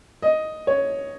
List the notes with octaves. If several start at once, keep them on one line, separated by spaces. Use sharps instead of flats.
D#5
C#5